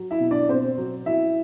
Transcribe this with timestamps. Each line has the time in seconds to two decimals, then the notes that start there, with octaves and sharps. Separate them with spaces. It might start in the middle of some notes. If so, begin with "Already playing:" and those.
Already playing: F#3
0.11 E4 E5
0.20 B2
0.31 D4 D5
0.49 B2 C4 C5
0.77 F#3
1.06 F#3 E4 E5